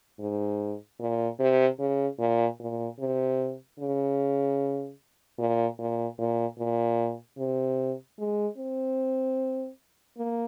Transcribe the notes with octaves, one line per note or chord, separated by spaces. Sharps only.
G#2
A#2
C3
C#3
A#2
A#2
C3
C#3
A#2
A#2
A#2
A#2
C3
G#3
C4
A#3